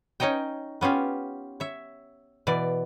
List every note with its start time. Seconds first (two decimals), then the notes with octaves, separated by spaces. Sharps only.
0.20 C#4 D#4 C#5 D#5 G5
0.81 B3 C#4 F4 G4
1.60 C#5 E5
2.47 B2 E3 D5